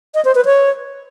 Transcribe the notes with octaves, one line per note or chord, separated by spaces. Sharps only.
D#5
C5
B4
C#5